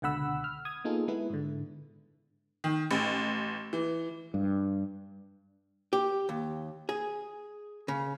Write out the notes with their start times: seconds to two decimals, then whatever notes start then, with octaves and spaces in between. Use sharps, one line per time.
0.02 C#2 B2 D3 F#5 B5 E6
0.44 F6
0.65 D#6 G#6
0.84 A#3 B3 D#4 F4 G#4 A4
1.08 G#3 B3 E4 B4
1.30 G#2 D3
2.64 D#3
2.91 A1
3.73 E3
4.34 G2
5.93 G4
6.29 D#2
6.89 G#4
7.88 C#3